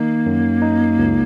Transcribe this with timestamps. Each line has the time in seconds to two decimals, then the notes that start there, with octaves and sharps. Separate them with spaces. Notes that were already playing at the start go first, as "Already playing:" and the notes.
Already playing: D#3 A#3 D#4
0.26 F#2
0.62 D#4
0.98 C#2